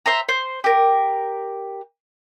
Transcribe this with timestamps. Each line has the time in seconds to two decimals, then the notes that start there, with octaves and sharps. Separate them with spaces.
0.06 C5 E5 A#5
0.29 C5
0.64 G4 A#4